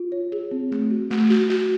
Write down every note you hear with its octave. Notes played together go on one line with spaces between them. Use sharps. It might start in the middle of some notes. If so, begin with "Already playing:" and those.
Already playing: F4
C#5
G#4
C4
A3
F#4
A3
F#4
F#4